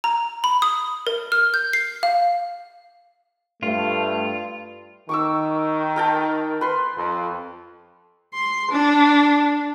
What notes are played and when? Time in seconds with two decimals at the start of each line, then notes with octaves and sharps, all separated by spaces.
0.04 A#5
0.44 B5
0.62 D#6
1.07 A#4
1.32 F6
1.54 G6
1.73 C7
2.03 F5
3.63 G2 A3 F4
5.09 D#3 C#6 D6 E6
5.96 A#4 G5 A5
6.61 B4 C6
6.98 F2
8.34 C6
8.71 D4